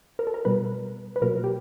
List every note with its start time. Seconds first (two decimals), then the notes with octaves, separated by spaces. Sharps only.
0.19 A#4
0.27 A4
0.34 A#4
0.45 B2 G3 B3 B4
1.16 B4
1.22 B2 F#3 A#3 A#4
1.44 G4